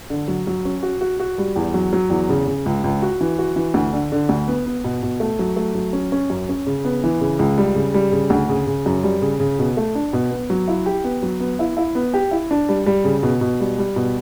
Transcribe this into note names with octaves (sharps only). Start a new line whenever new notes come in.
D3
F#3
F#3
C#4
F#4
F#4
F#4
G3
E2
F#3
F#3
E2
C#3
C#3
C#2
C#2
F#4
E3
F#4
E3
D2
D3
D3
D2
B3
B3
B2
B2
A3
F#3
A3
F#3
C#4
C#4
F#2
C#4
C#3
B3
E3
C#3
C#2
G3
C#3
G3
C#3
D2
C#3
C#3
F#2
G3
C#3
C#3
B2
A3
D4
B2
B3
F#3
E4
G4
B3
F#3
B3
E4
E4
B3
G4
E4
D4
G3
G3
C#3
B2
B2
G3
G3
B2